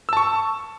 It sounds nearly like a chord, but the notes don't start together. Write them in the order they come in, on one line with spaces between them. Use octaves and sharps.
E6 A5 C#6